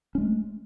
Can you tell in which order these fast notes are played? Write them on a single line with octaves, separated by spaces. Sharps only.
C#4 G#3 A3